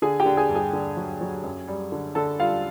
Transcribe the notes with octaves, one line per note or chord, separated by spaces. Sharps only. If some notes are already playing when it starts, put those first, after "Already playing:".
D3 G#4 G#5
G4 G5
D3
G#4 G#5
G2
G#4 G#5
D3
F#3
F#3
F#2
G3
D3
D3 A4 A5
G3 F4 F5